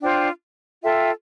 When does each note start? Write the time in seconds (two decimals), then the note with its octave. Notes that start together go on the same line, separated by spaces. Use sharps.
0.01 D4 F4 C5 G5
0.82 F4 A4 E5 G5